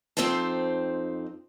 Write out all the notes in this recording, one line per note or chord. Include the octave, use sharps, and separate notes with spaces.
F2 C#3 C4 D#4 C5 A5